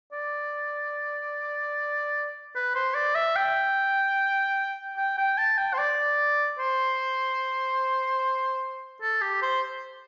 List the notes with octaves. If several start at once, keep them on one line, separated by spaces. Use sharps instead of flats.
D5
B4
C5
D5
E5
G5
G5
G5
A5
G5
C5
D5
C5
A4
G4
C5